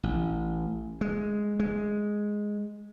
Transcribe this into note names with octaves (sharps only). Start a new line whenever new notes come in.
A1
G#3
G#3